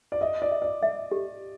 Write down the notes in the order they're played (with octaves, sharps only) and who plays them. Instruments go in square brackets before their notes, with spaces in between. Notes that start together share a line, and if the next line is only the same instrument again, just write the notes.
[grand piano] D5
[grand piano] D#5 [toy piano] E5
[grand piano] D5
[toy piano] E5
[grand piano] D5
[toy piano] E5
G4